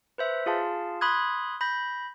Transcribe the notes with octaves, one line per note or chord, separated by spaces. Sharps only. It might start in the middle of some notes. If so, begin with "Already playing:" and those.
B4 C5 E5
F4 G#4 F5 A5
B5 C6 D#6 F#6 G#6
B5 G6 A#6